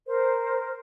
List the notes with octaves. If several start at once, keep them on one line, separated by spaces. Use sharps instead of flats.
A#4 C5